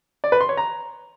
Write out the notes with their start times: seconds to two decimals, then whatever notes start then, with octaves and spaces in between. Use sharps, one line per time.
0.24 D5
0.32 B4
0.41 C6
0.49 C#5
0.57 A#5